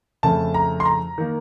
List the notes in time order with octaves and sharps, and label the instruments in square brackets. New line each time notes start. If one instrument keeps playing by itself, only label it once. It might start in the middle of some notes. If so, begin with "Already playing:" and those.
[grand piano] F2 C#3 A3 A5
A#5
C6
A#5
D#3 A#3